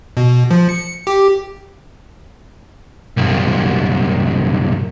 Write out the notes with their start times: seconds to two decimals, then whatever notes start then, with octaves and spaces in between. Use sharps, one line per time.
0.17 B2
0.51 F3
0.69 C#7
1.07 G4
3.17 C2 F#2